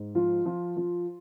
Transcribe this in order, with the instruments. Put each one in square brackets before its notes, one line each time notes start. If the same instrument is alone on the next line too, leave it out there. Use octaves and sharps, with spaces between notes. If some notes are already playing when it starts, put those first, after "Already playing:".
Already playing: [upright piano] G#2
F3 F4
F3
F3